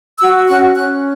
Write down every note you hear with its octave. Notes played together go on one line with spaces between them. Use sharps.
F#4 E6
C#4 F#6
C#4 F#6